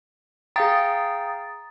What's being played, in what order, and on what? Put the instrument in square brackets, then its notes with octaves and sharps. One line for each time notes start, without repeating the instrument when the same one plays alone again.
[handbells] G#4 F5 G5 [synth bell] A#5 D#6 A6